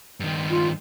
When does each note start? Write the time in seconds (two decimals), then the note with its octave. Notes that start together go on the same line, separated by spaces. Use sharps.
0.20 G2 D#3
0.50 F4